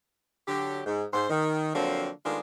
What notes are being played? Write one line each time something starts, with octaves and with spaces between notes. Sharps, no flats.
D3 F#3 G4
G#2
G#2 C5
D#3
D3 F3 F#3 A#3 C4 D4
D#3 G#3 A3 B3 D4 F4